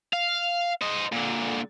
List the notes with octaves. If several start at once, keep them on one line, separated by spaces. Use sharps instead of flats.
F5
C5 D#5
A#2 D3